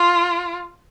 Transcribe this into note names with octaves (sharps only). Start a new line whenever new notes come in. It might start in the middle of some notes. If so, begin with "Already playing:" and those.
Already playing: F4